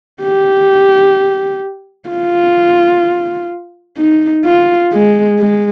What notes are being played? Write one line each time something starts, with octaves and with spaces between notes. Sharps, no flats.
G4
F4
D#4
F4
G#3
G#3